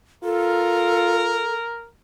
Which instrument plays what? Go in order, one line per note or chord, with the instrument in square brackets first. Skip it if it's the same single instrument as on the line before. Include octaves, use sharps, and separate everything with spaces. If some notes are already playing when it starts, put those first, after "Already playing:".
[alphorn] F4 [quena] A4 [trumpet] A#4